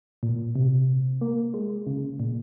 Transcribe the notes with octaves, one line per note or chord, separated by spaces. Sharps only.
A#2
C3
A#3
G#3
C#3
A#2